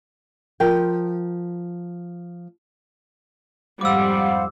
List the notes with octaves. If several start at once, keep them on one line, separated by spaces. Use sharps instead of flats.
F3 A#4 G5
F2 G#2 G3 C5 F5 F#5 D6 E6